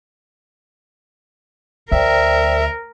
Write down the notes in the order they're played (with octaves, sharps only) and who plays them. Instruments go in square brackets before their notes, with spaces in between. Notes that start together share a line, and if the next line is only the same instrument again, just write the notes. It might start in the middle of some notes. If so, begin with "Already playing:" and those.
[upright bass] D2 [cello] A#4 [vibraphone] C5 D5 G5 [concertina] E5